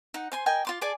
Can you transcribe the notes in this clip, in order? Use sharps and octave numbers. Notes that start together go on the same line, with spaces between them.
D#4 F#5
C5 G#5 C6
A#4 D#5 G5 G#5
F4 C6 D6
G#4 D5 G#5 A5